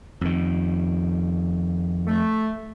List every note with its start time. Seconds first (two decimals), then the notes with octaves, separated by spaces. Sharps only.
0.21 F2 D#3
2.07 A3